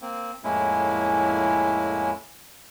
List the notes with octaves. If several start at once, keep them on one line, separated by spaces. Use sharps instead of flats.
A#3 C4
F2 A2 G#3 A#3 C#4 E4